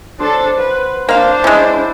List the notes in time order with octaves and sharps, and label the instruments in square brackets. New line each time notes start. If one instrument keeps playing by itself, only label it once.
[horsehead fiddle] D4 A4 [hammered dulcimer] C5 C#5
[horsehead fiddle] B4 [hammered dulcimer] F#5
[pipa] A#3 F5 [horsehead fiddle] D4 C5
[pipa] G#3 C#4 [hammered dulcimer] E4